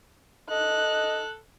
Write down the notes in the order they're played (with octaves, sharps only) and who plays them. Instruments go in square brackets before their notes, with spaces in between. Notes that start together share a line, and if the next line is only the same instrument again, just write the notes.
[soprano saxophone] A4 [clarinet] D#5 [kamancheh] F#6